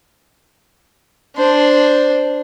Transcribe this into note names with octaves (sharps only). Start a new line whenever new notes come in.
D4 C5